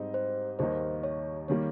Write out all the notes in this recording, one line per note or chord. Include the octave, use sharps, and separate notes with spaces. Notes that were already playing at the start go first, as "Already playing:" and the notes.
Already playing: G#2 G3 C4 D#4
C5
D#2 D#3 G3 A#3 D#4 C5
C#5
D#3 G3 A#3 C#5